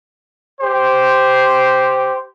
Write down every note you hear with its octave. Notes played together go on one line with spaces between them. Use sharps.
G4 C5